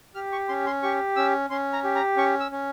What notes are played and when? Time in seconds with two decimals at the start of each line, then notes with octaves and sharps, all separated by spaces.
0.15 G4 F6
0.32 C#6
0.48 C#4 C6
0.66 C6
0.83 G4 C#6
1.16 C#4 E6
1.50 C#4 C6
1.73 A#5
1.84 G4
1.95 A#5
2.17 C#4 C#6
2.40 E6
2.52 C#4